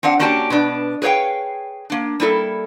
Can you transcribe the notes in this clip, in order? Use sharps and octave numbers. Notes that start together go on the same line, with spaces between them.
C4 D4 F5 F#5
A#3 C#4 D4 F#4 G4 A5
B2 B3 D4
G#4 B4 C#5 D5 F5 G5
A#3 D4
G3 A#3 E4 A4